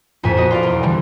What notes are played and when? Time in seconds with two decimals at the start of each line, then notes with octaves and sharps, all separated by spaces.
0.23 A#1 F2 A2 G#5 B6
0.37 B3 F#4 D#5
0.51 F4 D5 F5
0.63 E1 E2
0.83 D3 E3 F3 G3 C4